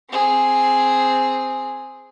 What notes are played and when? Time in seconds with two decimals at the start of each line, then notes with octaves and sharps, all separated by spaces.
0.10 C4 G#4